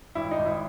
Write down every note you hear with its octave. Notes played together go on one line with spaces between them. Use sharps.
G#1 E4
D#4
G#1
E4